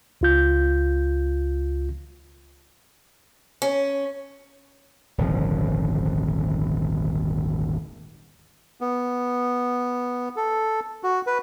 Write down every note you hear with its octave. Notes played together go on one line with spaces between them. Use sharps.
C#2 F4 G6
C#4
D#1 G#1 D3 F3
B3
A4
F#4
B4